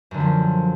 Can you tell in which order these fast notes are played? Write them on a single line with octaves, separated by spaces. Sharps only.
F#2 D3 A3 F3